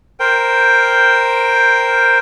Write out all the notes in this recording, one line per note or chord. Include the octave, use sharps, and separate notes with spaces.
A#4 C5 G5